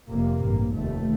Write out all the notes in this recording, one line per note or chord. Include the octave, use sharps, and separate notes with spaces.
F1 F2 C3 A#3
A1 G2
F1 D#2 A3